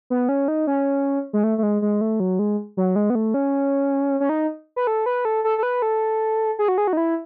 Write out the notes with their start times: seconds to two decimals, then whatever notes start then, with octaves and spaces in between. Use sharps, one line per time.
0.10 B3
0.29 C#4
0.48 D#4
0.67 C#4
1.33 G#3
1.44 A3
1.58 A3
1.63 G#3
1.82 G#3
2.01 A3
2.20 F#3
2.39 G#3
2.77 F#3
2.96 G#3
3.10 B3
3.15 A3
3.34 C#4
4.20 C#4
4.29 D#4
4.76 B4
4.87 A4
5.06 B4
5.25 A4
5.44 A4
5.58 A4
5.63 B4
5.82 A4
6.59 G#4
6.68 F#4
6.78 G#4
6.87 F#4
6.93 D#4
6.97 E4